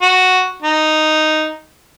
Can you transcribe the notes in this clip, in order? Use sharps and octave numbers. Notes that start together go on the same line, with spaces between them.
F#4
D#4